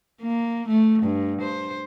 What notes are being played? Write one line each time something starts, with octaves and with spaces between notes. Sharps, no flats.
A#3
A3
G2
C5